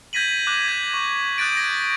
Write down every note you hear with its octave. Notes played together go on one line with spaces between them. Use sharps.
G6 G#6 A#6 B6 D#7 F#7
D6 F#6
G6 G#6
C#6
D#6 F#6 G6 A6 D7
G#6 A#6